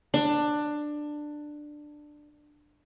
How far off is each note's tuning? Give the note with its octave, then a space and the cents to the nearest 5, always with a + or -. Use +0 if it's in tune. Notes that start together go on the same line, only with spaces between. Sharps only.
D4 +15